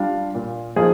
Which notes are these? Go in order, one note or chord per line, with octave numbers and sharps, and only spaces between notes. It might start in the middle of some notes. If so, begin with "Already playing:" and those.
Already playing: G3 D4 F4 F5
A#2
F3 A#3 D#4 G#4